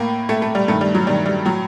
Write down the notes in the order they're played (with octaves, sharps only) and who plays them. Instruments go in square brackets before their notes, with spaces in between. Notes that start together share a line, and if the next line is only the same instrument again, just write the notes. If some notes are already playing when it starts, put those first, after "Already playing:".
Already playing: [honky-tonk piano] A2 A#3
A2 A3
A3
G3
G2 D#3 A3
G3
F#3
G2 D#3 G3
G3
A2 F#3